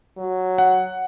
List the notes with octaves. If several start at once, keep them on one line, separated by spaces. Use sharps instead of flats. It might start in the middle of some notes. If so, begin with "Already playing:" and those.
F#3
F#5